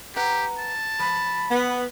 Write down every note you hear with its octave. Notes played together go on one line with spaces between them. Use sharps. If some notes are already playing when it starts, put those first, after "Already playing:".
G4 B4 F#5 A#5
A5
F3 B5
B3